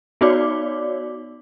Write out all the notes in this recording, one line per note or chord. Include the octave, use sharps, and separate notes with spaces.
B3 D#4 F#4 C#5 D5 D6